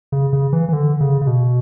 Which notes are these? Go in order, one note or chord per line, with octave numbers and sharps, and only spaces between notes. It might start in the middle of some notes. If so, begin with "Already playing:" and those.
C#3
C#3
E3
E3
D3
C#3
C#3
B2